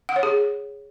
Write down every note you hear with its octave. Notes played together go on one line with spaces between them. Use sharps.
F#5
C#5
G#4